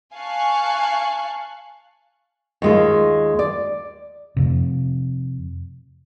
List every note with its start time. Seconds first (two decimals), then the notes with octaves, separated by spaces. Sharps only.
0.14 F5 G#5 A5 C#6 F#6
2.62 D#2 G#3 F4
3.39 D5
4.37 F2 C3